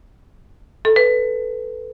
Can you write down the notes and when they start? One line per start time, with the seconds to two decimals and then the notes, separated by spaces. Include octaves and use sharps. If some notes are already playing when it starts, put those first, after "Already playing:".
0.85 A4
0.96 B4